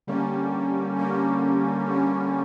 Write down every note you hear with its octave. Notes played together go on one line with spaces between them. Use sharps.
D3 G3 A#3 C#4
D3 G3 A#3 C#4
D3 G3 A#3 C#4